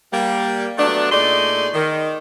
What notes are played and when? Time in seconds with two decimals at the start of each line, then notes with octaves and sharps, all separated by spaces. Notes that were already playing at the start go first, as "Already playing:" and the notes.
0.13 G3 A#3
0.78 F#3 A3 B3 D4
1.12 A#2 A3 D#4 G#4 D5 C6
1.74 D#3